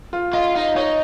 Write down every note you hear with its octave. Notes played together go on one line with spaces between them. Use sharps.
F4
F4 D#5
D#4 F5
D#4 C#5